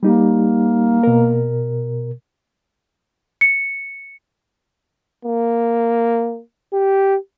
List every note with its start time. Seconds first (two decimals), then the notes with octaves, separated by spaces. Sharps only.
0.03 G3 A#3 D#4 G4
1.03 B2 A#4
3.41 C#7
5.25 A#3
6.73 G4